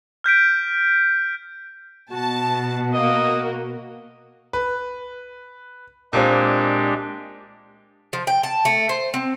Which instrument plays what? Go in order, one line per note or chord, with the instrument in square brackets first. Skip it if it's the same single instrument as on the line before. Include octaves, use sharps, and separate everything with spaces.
[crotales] F6 G6 B6 D7
[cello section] B2 [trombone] F#4 [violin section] A5
[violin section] A#3 [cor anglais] D#5
[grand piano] B4
[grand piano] A#2 A#3 C4 [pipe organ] G#3 D4 G4
[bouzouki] F3
G5
A5
A3
C5
C4